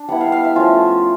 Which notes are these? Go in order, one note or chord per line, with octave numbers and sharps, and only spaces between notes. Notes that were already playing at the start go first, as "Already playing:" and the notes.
Already playing: D4
G3 B3 E4 F#5
F5
F5
E5
F3 A3 C#4 F4